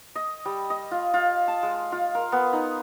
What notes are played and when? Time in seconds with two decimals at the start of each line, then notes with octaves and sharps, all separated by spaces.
0.15 D#5
0.45 G3
0.70 D#5
0.91 F4
1.14 F4
1.48 A5
1.63 G#3
1.92 F4
2.15 A#4
2.32 B3
2.53 D#4